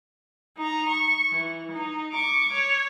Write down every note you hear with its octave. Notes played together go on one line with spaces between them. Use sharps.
D#4 A#5
C#6
E3
D#4
C#6 D6
C#5